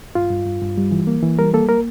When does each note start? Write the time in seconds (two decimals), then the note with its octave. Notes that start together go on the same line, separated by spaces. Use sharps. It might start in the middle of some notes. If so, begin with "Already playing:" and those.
0.15 G2 F4
0.31 G2
0.46 G2
0.62 G2
0.78 G3
0.92 E3
1.07 A#3
1.22 E3
1.39 G3 A#4
1.54 A#3 A4
1.69 A#3 A#4